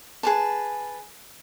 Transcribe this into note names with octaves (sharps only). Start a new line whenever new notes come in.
G#4 B4 A5